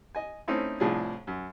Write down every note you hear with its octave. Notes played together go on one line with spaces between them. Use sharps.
D#5 G#5
A3 C4 C#4 D#4 E4
C2 A2 F3 D4 G#4
F#2